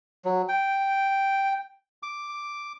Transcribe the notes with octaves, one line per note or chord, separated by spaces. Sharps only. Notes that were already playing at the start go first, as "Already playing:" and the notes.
F#3
G5
D6